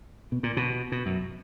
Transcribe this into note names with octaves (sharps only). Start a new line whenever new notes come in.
B2
A#2
B2
B2
F#2